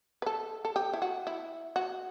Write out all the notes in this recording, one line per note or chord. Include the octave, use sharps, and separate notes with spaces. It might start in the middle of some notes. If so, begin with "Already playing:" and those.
B4
A4
A4
G4
E4
F#4
E4
F#4